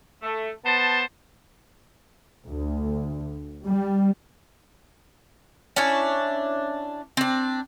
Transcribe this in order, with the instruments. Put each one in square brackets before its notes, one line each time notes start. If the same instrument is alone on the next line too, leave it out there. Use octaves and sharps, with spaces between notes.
[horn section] A3
B3 C5 A5
[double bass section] D2
G3
[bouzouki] C#4 D4 E4 C#5
C4 D4